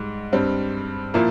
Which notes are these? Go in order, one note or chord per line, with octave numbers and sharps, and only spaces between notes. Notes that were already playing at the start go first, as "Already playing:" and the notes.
Already playing: G#2 G3
G2 G3 C4
A#2 F3 A#3 E4